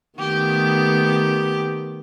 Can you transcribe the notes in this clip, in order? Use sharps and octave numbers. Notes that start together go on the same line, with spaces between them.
D#3 A3 B3 G4